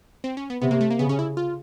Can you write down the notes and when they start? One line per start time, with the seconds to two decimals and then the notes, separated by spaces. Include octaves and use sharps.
0.24 C4
0.37 C#4
0.50 B3
0.62 C3 B3
0.71 A#3
0.81 A3
0.90 A#3
0.99 C#3 B3
1.09 C#4
1.19 E4
1.37 F4